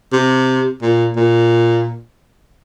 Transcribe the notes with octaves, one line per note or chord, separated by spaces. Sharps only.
C3
A#2
A#2